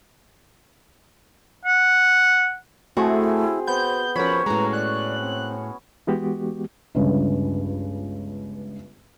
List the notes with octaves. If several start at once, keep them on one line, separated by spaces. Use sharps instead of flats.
F#5
A3 C4 E4 F#4 G#4 G#5
B3 C5 G6
F3 C#4 F#4 A#4 C5 C#5 B5
A2 G#3 B4 A#5
D5 F#6
C4
E3 G#3 B3 F#4 G4
G1 C#2 G2 C#3